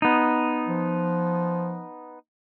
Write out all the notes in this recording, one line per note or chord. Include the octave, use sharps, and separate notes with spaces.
B3 D#4
F3